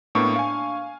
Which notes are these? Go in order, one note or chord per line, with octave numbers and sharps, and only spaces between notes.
A2 A#3 B3 D4 C#6
F5 G#5